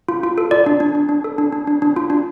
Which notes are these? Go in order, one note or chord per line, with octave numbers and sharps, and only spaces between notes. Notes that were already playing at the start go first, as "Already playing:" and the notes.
F4
F4
A4
F4 D5
D4
D4
D4
D4
A4
D4
D4
D4
D4
F4
D4